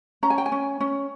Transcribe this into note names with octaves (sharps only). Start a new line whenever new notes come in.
C#4 A#5
G#5
G5
G#5
C#4
C#4